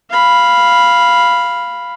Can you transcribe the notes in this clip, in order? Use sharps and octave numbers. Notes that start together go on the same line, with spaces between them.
F5 B5